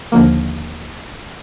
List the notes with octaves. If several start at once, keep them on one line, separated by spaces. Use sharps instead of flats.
D#2 D3 F3 A#3